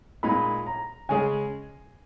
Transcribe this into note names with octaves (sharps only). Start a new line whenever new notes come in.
A#2 G#3 D#4 B5
A#5
C#3 G#3 C#4 G#4 G#5